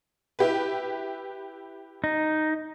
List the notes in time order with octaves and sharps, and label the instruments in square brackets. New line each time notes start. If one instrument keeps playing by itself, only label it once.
[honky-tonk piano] E4 G4 B4
[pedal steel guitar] D#4